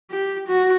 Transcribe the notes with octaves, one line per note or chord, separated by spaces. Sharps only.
G4
F#4